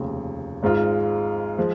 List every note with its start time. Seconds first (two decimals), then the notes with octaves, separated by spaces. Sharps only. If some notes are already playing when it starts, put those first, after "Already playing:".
Already playing: F1 D#2 C#3
0.63 G#1 G#2 G#3 F4
1.58 F3 G#3